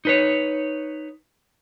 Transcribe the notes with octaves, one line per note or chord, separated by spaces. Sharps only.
D#4 B4 C#5